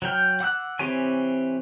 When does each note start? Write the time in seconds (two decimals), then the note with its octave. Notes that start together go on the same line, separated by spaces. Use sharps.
0.02 F#3 C#5 G5 F6
0.40 F#5 D6 E6 F#6
0.79 E3 C4 G4 C#5 G#5